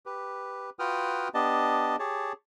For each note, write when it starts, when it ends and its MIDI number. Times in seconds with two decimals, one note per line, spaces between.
0.06 0.70 67
0.06 0.70 71
0.79 1.28 65
0.79 1.28 66
0.79 1.28 71
0.79 1.28 79
0.79 1.28 87
0.79 1.28 89
1.34 1.96 59
1.34 1.96 62
1.34 1.96 67
1.34 1.96 75
1.34 1.96 81
1.99 2.33 67
1.99 2.33 68
1.99 2.33 73
1.99 2.33 81